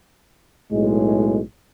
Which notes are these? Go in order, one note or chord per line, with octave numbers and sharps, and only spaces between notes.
B1 A2 G#3